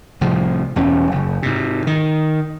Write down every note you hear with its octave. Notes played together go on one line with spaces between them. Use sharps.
C2 A2 F3
E1 E2 C#4
F#1
G#2 C3
D#3